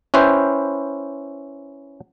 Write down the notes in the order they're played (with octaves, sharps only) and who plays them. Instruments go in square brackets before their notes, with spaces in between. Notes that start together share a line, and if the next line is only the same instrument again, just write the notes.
[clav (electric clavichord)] C#4 E4 B4 C5 G5